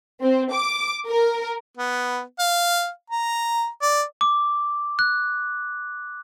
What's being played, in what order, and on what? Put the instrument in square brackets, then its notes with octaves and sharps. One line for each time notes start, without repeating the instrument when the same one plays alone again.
[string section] C4
D6
A#4
[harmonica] B3
F5
A#5
D5
[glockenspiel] D6
F#6